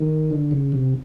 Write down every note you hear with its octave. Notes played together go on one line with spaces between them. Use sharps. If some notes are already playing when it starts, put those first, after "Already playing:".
Already playing: D#3
D3
C#3
C3